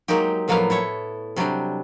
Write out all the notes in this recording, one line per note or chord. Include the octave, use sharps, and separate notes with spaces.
F#3 G#3 A#3 D#4 G4
A2 F3 F#3 A#3 B3 F5
E4 A4 C#5
C3 F#3 G3 D4